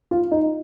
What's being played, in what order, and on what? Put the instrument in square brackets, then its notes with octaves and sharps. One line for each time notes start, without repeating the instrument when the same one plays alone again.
[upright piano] F4
D#4